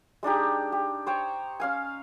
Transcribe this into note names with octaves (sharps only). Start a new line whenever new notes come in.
G#3 D4 D#4 G4
G4
C5 C#5 G5
C#4 F5 G#5